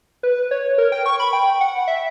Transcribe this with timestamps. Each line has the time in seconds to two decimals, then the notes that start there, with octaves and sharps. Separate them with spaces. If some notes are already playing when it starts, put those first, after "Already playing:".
0.23 B4
0.51 C#5
0.78 A#4
0.92 G5
1.06 C#6
1.20 B5
1.33 G5
1.61 F#5
1.88 E5